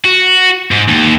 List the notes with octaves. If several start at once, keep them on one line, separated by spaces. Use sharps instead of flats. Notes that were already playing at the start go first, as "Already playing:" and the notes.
F#4
G#2
D#2